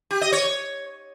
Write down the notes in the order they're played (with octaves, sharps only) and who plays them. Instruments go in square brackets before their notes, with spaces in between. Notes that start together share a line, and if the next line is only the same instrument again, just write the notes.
[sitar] G4
D#5
C#5